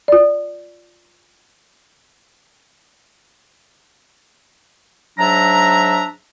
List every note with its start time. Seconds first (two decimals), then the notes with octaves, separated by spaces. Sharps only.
0.08 F4 D5
5.18 G#2 F#3 D4 E5 A#5